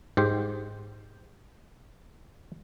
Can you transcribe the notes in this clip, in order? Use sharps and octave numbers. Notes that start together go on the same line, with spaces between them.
G#2 G4 C5